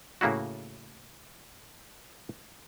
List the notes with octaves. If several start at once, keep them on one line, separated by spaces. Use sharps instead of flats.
A2 C#3 A#3 E4 F#4